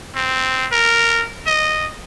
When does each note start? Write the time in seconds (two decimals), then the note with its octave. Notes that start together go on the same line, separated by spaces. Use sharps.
0.15 C4
0.72 A#4
1.46 D#5